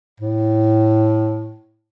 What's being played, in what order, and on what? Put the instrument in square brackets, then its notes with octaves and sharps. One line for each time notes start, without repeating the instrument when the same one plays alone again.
[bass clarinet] A2